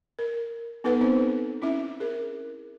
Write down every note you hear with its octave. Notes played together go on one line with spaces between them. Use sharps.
A#4
B3 D#4 A4 B4 F#5
C4 D#4 C5
C#4 E4 E5
G#4 A#4